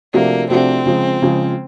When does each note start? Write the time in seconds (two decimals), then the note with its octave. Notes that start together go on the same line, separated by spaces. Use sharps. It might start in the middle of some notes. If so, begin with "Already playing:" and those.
0.14 C3 F3 A3 A#3 D4 F#4
0.50 C3 F3 A3 C4 D4 F#4
0.86 C#3 F3 G#3
1.22 C#3 F3 G#3